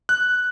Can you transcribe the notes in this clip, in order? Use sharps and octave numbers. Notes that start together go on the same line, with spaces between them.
F#6